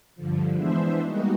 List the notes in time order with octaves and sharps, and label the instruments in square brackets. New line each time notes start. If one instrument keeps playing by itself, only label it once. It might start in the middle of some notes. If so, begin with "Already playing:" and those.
[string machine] G2 D3 F3
E3 G#3 B3 D4 C5 E5
G3 G#3 A#3 B3 D#4 F#4